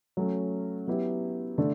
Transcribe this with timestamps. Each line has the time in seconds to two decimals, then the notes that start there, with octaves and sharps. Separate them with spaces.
0.17 F#3 A3 C#4
0.87 F#3 B3 E4 G4
1.58 D3 A3 D4